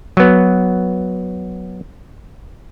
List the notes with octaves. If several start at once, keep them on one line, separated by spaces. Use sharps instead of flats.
F#3 B3